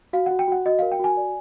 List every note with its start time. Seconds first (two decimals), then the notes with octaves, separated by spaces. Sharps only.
0.13 F#4 F5
0.26 F#4 F#5
0.39 G5
0.48 F#4 F#5
0.66 F#4 D#5
0.79 A#4 F5
0.92 G5
1.00 F#4 G#5
1.17 D5